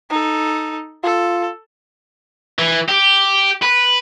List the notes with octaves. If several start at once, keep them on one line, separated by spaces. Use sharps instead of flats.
D#4 A4
F4 A4
E3
G4
B4